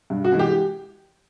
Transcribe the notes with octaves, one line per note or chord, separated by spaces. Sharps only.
G2
F#4
E3 G#3
G4